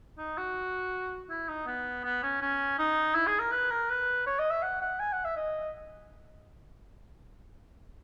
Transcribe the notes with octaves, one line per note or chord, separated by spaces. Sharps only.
D#4
F#4
E4
D#4
B3
B3
C#4
C#4
D#4
E4
G#4
A#4
B4
A#4
B4
C#5
D#5
E5
F#5
F#5
G#5
F#5
E5
D#5